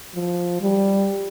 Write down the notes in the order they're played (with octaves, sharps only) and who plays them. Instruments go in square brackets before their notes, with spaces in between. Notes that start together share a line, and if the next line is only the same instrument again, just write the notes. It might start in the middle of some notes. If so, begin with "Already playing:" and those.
[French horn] F3
G3